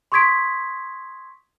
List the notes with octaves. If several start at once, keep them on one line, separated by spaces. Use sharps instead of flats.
C6 C#6 D#6 G#6 B6 D7